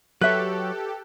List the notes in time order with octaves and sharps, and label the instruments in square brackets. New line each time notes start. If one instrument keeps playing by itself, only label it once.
[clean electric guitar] F#3 C#5 [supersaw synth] G4 A4 [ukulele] B4 E5 [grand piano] F#6